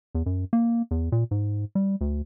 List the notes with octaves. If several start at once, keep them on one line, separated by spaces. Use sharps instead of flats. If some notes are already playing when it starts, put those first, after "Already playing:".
E2
F#2
A#3
E2
A#2
G#2
G3
D2